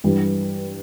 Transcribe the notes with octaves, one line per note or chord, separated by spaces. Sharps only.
G2 E3 G3